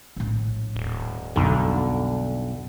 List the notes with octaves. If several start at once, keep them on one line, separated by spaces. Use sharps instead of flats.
A#1 A2
D#1
B1 F2 D3 G3